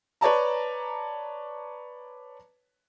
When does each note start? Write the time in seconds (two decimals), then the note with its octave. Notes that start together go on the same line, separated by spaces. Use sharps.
0.21 B4 C#5 D5 A5 A#5